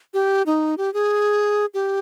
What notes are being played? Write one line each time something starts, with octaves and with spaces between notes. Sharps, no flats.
G4
D#4
G4
G#4
G4